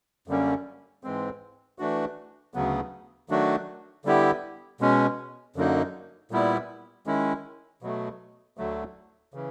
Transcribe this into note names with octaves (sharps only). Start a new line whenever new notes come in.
F#2 D3 G3 A#3 C#4
G#2 E3 G#3 C4
E3 A3 D4 F#4
D2 C#3 F#3 B3
D#3 F#3 A3 D4 F#4
D3 G3 B3 E4 G4
B2 G#3 C#4
F#2 D3 F#3 A#3 D#4
A#2 G3 B3 E4
D#3 G#3 C#4 E4
B2 F#3 A3
D2 D3 F#3 A3
C#3 E3